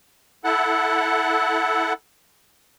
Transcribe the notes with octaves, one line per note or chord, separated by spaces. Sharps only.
E4 A4 F#5